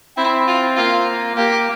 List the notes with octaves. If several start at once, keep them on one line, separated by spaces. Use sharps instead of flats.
C4 E4
F4
A#3 F4
A#3 G4